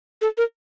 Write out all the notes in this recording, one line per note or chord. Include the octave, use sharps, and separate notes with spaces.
A4
A#4